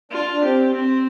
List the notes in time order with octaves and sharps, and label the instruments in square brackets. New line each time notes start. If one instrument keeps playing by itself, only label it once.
[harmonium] D4 [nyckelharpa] F4
[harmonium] D4
[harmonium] C4 [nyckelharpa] G4
[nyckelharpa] C4